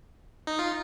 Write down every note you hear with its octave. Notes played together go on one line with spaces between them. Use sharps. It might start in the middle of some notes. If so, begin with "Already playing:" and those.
D#4
F4